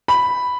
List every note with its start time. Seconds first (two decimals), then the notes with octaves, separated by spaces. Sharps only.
0.08 B5